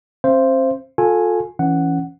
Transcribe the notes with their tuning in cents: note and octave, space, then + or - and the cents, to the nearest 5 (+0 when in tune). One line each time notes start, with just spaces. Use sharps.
C4 +40 C5 +0 F5 -45
F4 +35 A4 +0 G#5 +0
E3 +0 C#4 +0 F#5 +0